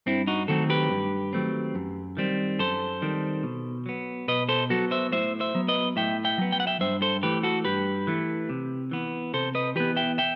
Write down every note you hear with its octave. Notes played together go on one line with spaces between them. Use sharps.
G2 C4 E4
D#4 F#4
D#3 F#3 A3 C4 F#4 A4
G4 B4
G2
D#3 F#3 A3 C4
F#2
D#3 G3 C4
F#2 A4 C5
D#3 G3 C4
B2
F#3 B3
B2 B4 D#5
A4 C5
F#3 B3 F#4 A4
C5 E5
A2 C5 E5
C5 E5
F#3 B3
B4 D#5
A2 E5 G5
E5 G5
F#3 B3
G5
F#5
E5 G5
G2 C5 E5
A4 C5
E3 A3 G4 B4
F#4 A4
G2 G4 B4
E3 A3
C3
E3 B3
C3 A4 C5
B4 D#5
E3 B3 G4 B4
E5 G5
E5 G5